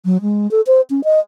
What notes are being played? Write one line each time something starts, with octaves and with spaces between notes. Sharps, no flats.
F#3
G#3
A4
C5
C#4
D#5